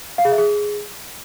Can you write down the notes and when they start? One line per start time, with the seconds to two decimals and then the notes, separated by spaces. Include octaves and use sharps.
0.18 F5
0.25 G#4
0.32 E5
0.38 G#4